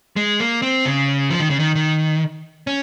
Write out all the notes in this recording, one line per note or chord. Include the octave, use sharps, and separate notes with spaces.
G#3
A#3
C4
C#3
F3
D#3
C#3
D#3
D#3
C#4